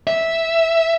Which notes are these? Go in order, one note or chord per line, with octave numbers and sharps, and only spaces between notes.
E5